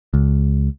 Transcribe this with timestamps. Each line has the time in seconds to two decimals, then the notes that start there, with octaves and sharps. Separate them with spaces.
0.14 C#2